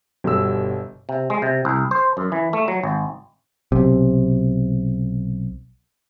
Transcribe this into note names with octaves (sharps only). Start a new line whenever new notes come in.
G1 B2 G3 E6
C3
G#3
C3
C2
C5
F#2
E3
A3
F#3
G#1
B1 C3